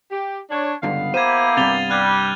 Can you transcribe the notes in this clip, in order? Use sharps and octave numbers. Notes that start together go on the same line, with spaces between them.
G4
D4 C#5
C#2 G2 D3 B3 F5
A#3 E4 G4 C5 G#6 D#7
G2 C3 A6 F7 G7
G3 F6 F#6 G#6